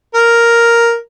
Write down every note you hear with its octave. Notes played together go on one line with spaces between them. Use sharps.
A#4